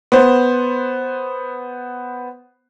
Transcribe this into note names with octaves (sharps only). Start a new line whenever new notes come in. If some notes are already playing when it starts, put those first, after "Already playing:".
B3 C5